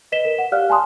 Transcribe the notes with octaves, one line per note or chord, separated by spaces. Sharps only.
B4 D#5 B6 E7 G7
A#4
F#5
G4 D5 F5 F6 F#6
G#5 A5 C6 D#6